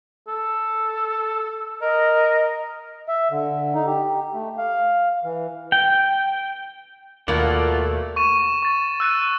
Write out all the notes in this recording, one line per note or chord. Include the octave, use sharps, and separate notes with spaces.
A4
A#4 D#5
E5
D3
D#4
G4
A3
F5
E3
G5
D#2 B2 A3 A#3 F4 D5 F#5
C#6 D#7 E7
C#6 A6
E6 F#6 A6 D#7